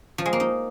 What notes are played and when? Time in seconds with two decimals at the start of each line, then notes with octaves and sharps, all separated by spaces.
0.18 F3
0.26 G#3
0.33 A#3
0.40 D#4